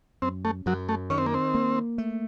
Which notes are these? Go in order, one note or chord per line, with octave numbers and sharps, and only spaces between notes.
F#2 C4
A3
F#2 F#3
A3
D#3 C#4
C4
A#3
C4
A#3
A3